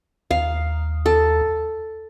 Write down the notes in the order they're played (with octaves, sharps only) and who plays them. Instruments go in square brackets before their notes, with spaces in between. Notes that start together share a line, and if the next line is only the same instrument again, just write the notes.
[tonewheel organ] D#2 [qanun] F5
[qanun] A4